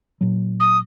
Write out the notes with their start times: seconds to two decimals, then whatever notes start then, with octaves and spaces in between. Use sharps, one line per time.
0.21 A#2 F#3
0.60 D#6